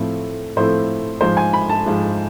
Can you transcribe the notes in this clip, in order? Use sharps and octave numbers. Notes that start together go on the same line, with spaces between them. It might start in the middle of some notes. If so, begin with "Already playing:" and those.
Already playing: A2 F3 A3 C4 E4
A2 F3 A3 C4 E4 C5
G#2 F3 G#3 C5
G#5
B5
A5
G#2 F3 G#3